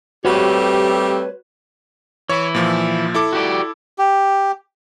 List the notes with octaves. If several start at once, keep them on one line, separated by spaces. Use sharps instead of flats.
G3 A3 C4 F#4 G4 B4 C#5
E3 E4 C#5 C#6
A#2 F3
E4 A4 D6
F#4 G4 D5
G4